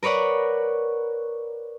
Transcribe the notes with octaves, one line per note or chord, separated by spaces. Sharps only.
A#4 B4 C#5 D5 F#5